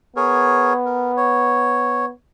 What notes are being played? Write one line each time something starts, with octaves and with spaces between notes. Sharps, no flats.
B3 G#4 A#4 C#5
A#4
C#5